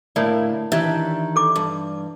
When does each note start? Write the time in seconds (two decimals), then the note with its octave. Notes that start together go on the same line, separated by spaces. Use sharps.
0.16 A2 D3 A#3 E4 C#5 D5
0.72 D#3 E3 D4 G4 E5 G#6
1.36 A4 D6
1.56 G2